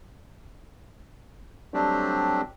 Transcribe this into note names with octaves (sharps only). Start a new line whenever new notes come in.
F#3 G3 A3 C4 D4 G4